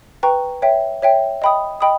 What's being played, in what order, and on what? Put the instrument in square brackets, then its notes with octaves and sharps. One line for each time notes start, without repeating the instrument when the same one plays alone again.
[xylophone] B4 G5 A#5 C#6
C#5 E5 G5
C#5 E5 G5
D#5 G5 B5 D#6
D#5 G5 B5 D#6